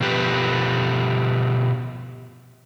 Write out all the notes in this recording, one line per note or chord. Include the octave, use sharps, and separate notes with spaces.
B2 F3 G4 B4